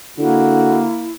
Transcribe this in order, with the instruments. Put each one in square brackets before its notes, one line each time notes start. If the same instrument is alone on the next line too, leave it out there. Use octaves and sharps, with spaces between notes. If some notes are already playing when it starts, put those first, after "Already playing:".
[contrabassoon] D3 [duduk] A#3 [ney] E4 [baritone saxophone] F#4